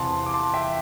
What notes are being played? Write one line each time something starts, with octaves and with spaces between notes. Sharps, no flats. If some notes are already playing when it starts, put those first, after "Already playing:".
Already playing: E2 C3 E3 F5 A5 C6
D6
A5 C6
E5 G5